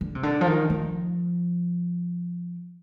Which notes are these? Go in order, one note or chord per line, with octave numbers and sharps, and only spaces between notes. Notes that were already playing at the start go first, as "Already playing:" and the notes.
D3
C3
D3
F3
D#3
F3